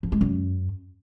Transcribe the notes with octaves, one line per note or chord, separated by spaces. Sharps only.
F3
G#3
F#2